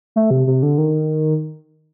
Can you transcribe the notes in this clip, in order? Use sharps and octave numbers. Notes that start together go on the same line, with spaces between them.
A3
C3
C3
D3
D#3